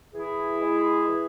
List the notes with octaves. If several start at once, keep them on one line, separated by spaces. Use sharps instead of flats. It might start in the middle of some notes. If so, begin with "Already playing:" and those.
E3 E4 G#4
G#3
E3